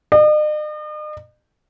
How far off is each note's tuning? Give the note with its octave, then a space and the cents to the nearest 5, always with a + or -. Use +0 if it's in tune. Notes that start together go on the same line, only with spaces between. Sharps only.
D#5 -45